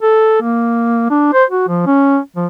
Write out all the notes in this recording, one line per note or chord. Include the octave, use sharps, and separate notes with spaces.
A4
A#3
D4
C5
F#4
F3
C#4
F3